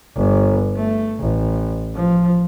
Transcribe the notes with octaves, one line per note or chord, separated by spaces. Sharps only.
G1
A3
A1
F3